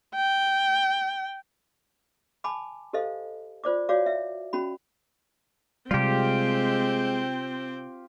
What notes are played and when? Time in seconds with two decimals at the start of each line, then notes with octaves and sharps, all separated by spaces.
0.15 G5
2.44 G#5 A5 B5 D6
2.93 G4 A4 C5 D#5 F5
3.64 F4 C5 D5 D6
3.89 F#4 C#5 D5 F5 D6
4.06 E5
4.53 C#4 F#4 B5
5.91 C3 G3 G#3 C4 F4 G4 G5